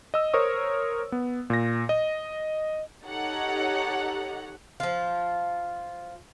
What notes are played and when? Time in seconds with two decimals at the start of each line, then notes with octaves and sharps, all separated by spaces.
0.14 D#5 E6
0.34 A#4 C5 C#5 C#6 D#6
1.12 B3
1.50 A#2 A#6
1.89 D#5
3.04 D#4 G4 A4 C#5 F#5 A#5
4.80 F3 F4